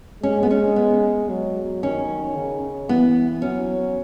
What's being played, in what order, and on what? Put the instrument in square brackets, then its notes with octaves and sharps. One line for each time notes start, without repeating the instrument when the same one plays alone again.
[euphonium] G#3 [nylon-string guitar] C#4
[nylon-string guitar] B3
C#4
B3
[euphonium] F#3
[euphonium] D#3 [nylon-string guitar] C#4
[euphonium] C#3
[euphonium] E3 [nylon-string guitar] B3
[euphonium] F#3 [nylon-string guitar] C#4